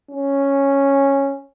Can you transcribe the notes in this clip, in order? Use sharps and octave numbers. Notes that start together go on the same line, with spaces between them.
C#4